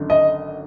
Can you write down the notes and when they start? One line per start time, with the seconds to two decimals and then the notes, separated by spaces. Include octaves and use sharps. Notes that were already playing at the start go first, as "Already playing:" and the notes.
Already playing: G#1 F#2 D3
0.10 D#5